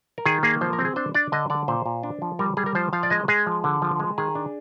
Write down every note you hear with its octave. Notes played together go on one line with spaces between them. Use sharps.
A#4
D#3 G#4
A#3 G#4
F3 C5
A#4
C4
G#4
D4 C5
D4 D5
D3 D#5
D3 D5
A#2 C5
A#2
D4
F3
G3 A#4
G3 G#4
A#4
F3 C5
F3 F5
D5
G#3 D#5
G#3 G#4
F3
D3
F3
G#3
D#3 G#4
D4